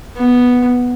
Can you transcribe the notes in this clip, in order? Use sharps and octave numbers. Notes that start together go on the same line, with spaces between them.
B3